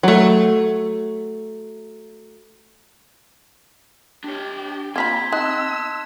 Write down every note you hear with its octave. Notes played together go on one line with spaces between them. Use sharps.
F#3 A3
D4 G4 C#5
A#3 C4 F4 A#5 B5 G#6 B6
D#4 A5 C6 E6 F#6